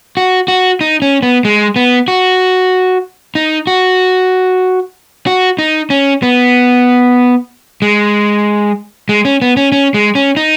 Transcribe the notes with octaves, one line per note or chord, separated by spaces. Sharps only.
F#4
F#4
D#4
C#4
B3
G#3
B3
F#4
D#4
F#4
F#4
D#4
C#4
B3
G#3
G#3
C#4
B3
C#4
C#4
G#3
C#4
D#4